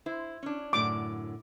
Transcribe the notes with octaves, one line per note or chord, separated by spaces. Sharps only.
E4 C5
C#4 D4
F#2 A2 D3 D6